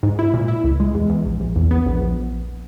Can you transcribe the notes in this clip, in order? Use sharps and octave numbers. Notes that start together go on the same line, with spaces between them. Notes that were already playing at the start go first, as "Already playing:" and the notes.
G#2
E4
A#2
E4
C#2
G#3
E2
E2
A#1
A#1
E2
B3
A#1
A#1